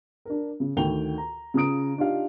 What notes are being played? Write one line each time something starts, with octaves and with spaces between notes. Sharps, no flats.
D4 A#4
C#3
D2 D#3 G5 F7 G7
A#5
C#3 F4 A#5 D#6 D7
D4 D#4 F4 G4 F5